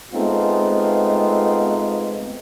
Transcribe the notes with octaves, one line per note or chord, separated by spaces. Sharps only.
G#3 A3 B3 C4 D#4 F4